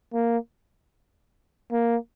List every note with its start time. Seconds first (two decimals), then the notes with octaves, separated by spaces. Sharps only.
0.14 A#3
1.72 A#3